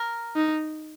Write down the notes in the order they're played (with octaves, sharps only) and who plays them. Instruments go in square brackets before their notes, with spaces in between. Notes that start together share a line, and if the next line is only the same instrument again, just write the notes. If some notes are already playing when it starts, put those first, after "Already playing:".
Already playing: [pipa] A#4
[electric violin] D#4